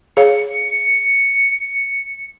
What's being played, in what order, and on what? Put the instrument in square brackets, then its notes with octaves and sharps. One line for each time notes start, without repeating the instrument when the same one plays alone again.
[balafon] G#4 C#5 F5 [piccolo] C#7